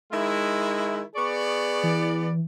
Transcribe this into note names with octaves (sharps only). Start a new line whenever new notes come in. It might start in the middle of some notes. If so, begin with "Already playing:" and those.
D#3 G#3 E4
B3 G#4 D5 C#6
E3